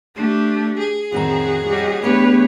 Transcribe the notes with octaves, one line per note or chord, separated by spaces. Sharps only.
A3 D4 G4
G#4
F2 A2 D#3 C4 C#4 F#4 A#5
G3 C#4 F#4 G4 D#5
E2 A3 B3 D4 G4 B4 C#5